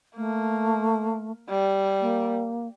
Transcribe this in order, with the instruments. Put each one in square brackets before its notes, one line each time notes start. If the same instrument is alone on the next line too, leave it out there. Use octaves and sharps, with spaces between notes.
[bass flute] A3 [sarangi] A#3
[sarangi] G3
[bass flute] A#3